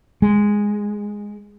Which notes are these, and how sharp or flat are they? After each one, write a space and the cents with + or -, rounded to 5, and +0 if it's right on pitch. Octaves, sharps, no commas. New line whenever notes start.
G#3 -5